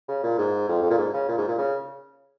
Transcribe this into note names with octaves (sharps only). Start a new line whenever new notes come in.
C#3
A#2
G#2
F2
F2
A#2
G#2
C#3
A#2
G#2
A#2
C#3